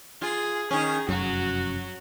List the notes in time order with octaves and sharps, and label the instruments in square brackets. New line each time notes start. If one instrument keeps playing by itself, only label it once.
[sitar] F4 [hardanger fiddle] G#4
[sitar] D#3 C#4 [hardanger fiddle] G#4
[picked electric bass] F1 F#2 [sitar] F#3 [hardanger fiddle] F#4